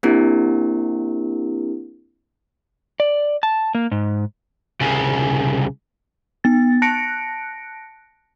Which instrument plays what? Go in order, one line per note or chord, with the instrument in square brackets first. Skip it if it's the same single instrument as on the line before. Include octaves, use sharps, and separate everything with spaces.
[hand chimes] A#3 C4 D4 E4 G4 A#4
[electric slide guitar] D5
A5
A#3
G#2
[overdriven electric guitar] C2 C#3
[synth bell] B3 A6
A5 F#6 A#6 C#7 D7